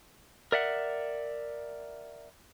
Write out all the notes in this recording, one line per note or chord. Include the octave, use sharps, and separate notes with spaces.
A#4 D5 E5 F#5